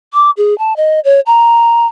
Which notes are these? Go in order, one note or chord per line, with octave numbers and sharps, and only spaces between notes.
D6
G#4
A5
D#5
C#5
A#5